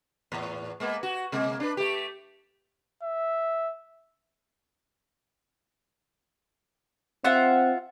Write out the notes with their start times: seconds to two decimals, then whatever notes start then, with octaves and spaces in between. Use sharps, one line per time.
0.32 E2 A2
0.80 G#3 A#3 B3
1.03 F#4
1.32 C3 G#3 A#3
1.60 D4 B4
1.77 A3 G4
3.03 E5
7.24 C4 F4 E5 F#5